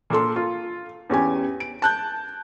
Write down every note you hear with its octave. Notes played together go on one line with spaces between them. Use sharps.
A#2 A#3 A4 C6
F4
E2 C#4 G4 G#5
D7
A5 F#6 G6